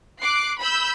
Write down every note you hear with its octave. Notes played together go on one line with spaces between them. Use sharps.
D6 F#6 C7
B5 E6 G6